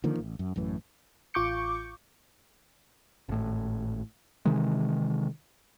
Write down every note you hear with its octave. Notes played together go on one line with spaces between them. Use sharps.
D3 D#3 F3 A#3
A1
F#2
A1 F#2 A2 E3
A1 F4 C#6 D6 G6 C#7
G#1 A2
C3 D#3 E3 G#3